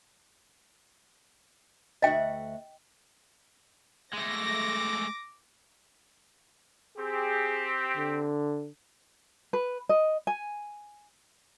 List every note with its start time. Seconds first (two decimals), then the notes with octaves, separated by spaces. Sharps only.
2.02 D2 F#4 D#5 E5 G5
4.13 G#3 A3 D6 A#6
6.98 C4 G4 G#4
7.97 D3
9.53 B4
9.89 D#5
10.27 G#5